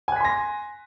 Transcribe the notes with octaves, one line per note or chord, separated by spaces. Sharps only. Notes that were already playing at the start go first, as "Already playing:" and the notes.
G#5 C6 F#6 A#6 B6